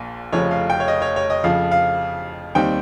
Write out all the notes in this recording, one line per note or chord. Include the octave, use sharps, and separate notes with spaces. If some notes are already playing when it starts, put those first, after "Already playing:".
Already playing: A#1 A#2
F1 F2 C#3 F3 C#5
F5
G5
C#5
D#5
C#5
C#5
D#5
F2 C#3 F3 F5
F5
D#2 D#3 G3 C4 D#4 G5